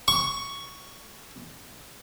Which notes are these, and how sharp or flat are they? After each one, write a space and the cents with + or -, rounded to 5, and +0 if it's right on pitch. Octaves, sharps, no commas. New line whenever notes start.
C#6 +5